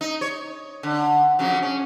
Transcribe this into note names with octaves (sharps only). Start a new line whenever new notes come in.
D#4
C#5
D3
F2 C#3 F#3
C#4